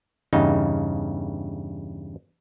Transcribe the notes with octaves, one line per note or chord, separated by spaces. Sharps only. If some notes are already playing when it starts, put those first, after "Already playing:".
E2 G2 C#3 D#4